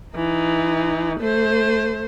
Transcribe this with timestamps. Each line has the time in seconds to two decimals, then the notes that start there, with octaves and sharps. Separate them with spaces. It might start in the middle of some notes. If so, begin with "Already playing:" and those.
0.15 E3 D#4
1.20 A3 C5